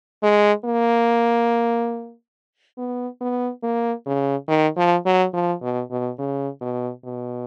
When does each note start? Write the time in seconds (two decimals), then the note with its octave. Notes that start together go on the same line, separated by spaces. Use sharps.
0.23 G#3
0.65 A#3
2.78 B3
3.21 B3
3.63 A#3
4.06 C#3
4.48 D#3
4.76 F3
5.06 F#3
5.33 F3
5.62 B2
5.91 B2
6.19 C#3
6.61 B2
7.04 B2